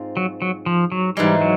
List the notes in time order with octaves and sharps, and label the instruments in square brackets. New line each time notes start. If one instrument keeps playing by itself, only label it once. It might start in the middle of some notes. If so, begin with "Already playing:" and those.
Already playing: [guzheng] G#2 C4 F4
[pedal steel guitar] F#3
F#3
F3
F#3
[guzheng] G#2 E3 G#3 [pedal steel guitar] G3
[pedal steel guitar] F#3